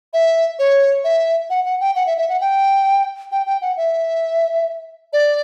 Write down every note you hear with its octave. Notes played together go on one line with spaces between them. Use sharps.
E5
C#5
E5
F#5
F#5
G5
F#5
E5
E5
F#5
G5
G5
G5
F#5
E5
D5